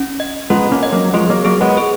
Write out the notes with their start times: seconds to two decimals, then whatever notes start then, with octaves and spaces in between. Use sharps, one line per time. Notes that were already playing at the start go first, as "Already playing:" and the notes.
Already playing: C#4
0.20 D#5
0.50 G#3 B3 F4
0.72 A#3 C#4
0.83 D#5
0.93 F#3 A#3
1.13 F3 G#3 G#4
1.29 F#3 A#3
1.45 F#3 A#3 G#4
1.61 G#3 B3
1.77 G#4